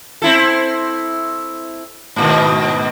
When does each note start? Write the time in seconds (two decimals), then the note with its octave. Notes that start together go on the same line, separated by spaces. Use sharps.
0.22 C4 E4 A4
2.16 G#2 B2 D#3